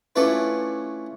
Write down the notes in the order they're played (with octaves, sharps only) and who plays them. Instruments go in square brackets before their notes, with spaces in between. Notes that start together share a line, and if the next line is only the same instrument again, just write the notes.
[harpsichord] A3 C#4 D4 E4 F4 B4